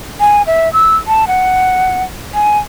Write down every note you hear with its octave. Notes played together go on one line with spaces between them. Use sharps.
G#5
E5
E6
A5
F#5
G#5